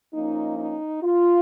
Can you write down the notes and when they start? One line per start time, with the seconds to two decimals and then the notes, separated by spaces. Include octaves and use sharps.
0.14 F3 A#3 C#4 D#4
0.58 D#4
1.03 F4